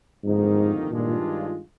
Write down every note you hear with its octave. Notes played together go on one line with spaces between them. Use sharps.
G1 F2 G#2 D#3 A#3 D#4
G2 A#2 D#3 G#3 D4 F4